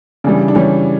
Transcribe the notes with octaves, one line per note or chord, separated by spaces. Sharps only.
C#3 E3 G3 D4
D4
C#3 E3 G3 C#4